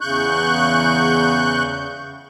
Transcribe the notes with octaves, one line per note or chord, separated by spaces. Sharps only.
E2 C#3 C#6 F#6 G6